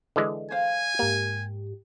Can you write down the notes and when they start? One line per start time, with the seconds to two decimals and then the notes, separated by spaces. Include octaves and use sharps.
0.16 D3 E3 G#3
0.51 C5 F5 G#5
0.99 G#2 A#3 G4